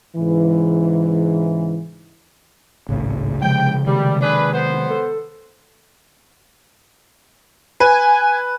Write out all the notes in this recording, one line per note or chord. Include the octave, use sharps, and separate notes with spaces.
G#2 C#3 E3
G#1 C#2 A2 C#3
C3 F3 G#3 G5
C3 D#3 G3 G#3
D4 G#4 B4
B3 C5
A4
B4 G#5